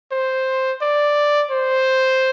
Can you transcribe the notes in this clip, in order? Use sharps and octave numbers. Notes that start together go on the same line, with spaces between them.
C5
D5
C5